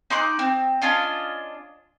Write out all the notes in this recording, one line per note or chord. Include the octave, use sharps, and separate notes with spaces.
D#4 C6 D6 F#6
C4
C#4 D4 F4 D#5